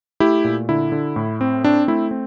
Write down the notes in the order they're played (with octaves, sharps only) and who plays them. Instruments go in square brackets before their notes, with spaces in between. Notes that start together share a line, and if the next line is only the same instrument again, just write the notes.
[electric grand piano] A3 E4 G4
A#2
D3 E4
D3
A2
C4
C4 D4
A3 E4
C4